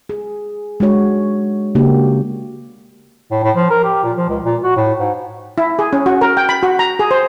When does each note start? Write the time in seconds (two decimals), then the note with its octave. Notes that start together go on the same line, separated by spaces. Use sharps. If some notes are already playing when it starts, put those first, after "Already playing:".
0.09 G#4
0.80 G#3 D4 F#4 C#5
1.75 C#3 A#3 D4 F#4 G4
3.31 A2
3.43 A2
3.56 F3
3.71 A#4
3.84 G4
4.04 A#2
4.17 F3
4.29 C#2
4.44 A#2
4.64 F#4
4.77 A2
4.99 G#2
5.58 E4
5.79 G#4
5.93 C#4
6.06 F#4
6.21 A#4
6.37 G5
6.49 B5
6.63 F#4
6.79 A#5
6.99 G#4
7.11 C5